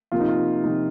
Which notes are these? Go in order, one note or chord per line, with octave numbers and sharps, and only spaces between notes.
C3 F3 A#3 F4
D#4
F4
C3 F3 A#3 D#4